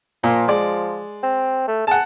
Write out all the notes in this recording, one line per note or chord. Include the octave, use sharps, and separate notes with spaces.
A#2 F3 A#3
G#3 D5
C4
A3
G#4 F#5 A5